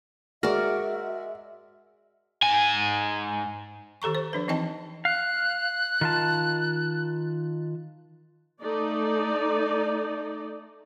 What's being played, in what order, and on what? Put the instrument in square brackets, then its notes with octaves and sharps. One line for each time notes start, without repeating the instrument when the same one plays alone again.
[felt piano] G#3 [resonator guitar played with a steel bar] F#4 [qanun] A#4 D5 [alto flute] E5
[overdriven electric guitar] G#2 G#5
[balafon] D#3 G4 A4 A#5 C#6
C5
F3 D4 B4
E3 C4 D#4 D#5 G5 A5
[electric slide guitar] F5 [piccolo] F#6
[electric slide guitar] D#3 F4 A5
[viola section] A3 D#4 D5